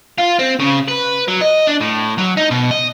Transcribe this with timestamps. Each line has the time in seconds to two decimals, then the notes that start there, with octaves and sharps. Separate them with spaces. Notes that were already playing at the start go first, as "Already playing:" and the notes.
0.18 F4
0.39 C4
0.60 C#3
0.88 B4
1.28 F#3
1.42 D#5
1.67 D4
1.81 A2
2.18 F#3
2.37 D#4
2.51 B2
2.71 D#5